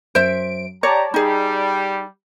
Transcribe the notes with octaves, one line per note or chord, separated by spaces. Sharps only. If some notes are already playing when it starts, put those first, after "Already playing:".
F#2 C5 E5 D7
G4 C#5 D5 A5 A#5
G3 D#4 G#4